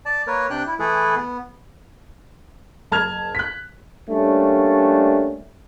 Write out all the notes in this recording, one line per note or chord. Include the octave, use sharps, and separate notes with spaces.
D5 A5
A#3 A#4 B4 C#5
C3 D4 G5 F#6
E4
E3 A3 E4 G#4 A4 B4
B3
F#1 A5 F6 G#6 F7
F#6 B6
G3 A3 A#3 C#4 D4